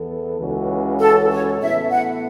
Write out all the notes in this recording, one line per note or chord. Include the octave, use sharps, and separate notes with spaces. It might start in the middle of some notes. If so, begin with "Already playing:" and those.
Already playing: E2 E3 B3 A4
C#2 C#3 E3 C#4 F#4
A4
C#5
A2 E3 B3 E4 A4 E5
F#5